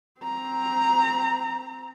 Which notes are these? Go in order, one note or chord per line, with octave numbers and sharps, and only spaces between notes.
C4 A#5